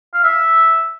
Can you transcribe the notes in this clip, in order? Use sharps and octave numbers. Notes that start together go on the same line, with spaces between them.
F5
E5